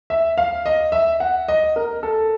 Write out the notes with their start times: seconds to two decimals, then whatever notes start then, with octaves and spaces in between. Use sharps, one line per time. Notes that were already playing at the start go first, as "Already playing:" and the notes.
0.10 E5
0.38 F5
0.66 D#5
0.92 E5
1.20 F#5
1.48 D#5
1.76 A#4
2.03 A4